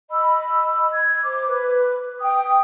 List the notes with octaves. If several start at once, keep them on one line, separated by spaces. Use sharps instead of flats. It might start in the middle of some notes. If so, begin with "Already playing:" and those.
D#5 B5 E6
G#6
C5 D6
B4
G5 D#6